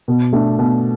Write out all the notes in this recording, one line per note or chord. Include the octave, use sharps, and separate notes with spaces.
B2
A3 D4
B2